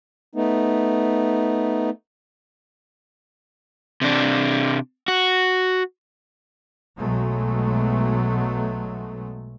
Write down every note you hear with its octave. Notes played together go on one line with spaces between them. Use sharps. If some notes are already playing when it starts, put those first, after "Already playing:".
A3 B3 D#4
C3 D4
F#4
B1 B2 F#3 G#3 A3